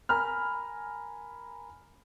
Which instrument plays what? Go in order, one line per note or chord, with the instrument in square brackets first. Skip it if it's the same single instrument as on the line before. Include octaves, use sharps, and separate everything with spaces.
[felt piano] A#4 G#5 A#5 B5 F6